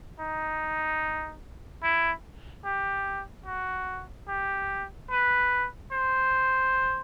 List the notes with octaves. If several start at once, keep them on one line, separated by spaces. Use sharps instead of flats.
D#4
E4
G4
F#4
G4
B4
C5